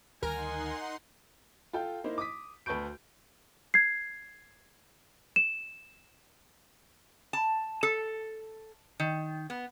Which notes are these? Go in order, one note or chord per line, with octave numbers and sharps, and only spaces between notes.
D2 D#3 G3 D#4 A#4 F#5 G#5 C6
F4 A4 G5
A#3 D#4 E4 C5
D6 D#6 B6
D2 B4 A5 C#6 G6 D7
G#6 C7
E7
A5
A4
D#3
B3